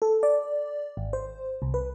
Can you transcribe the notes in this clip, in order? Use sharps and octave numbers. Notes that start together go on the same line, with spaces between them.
A4
D5
G#1
C5
C2
B4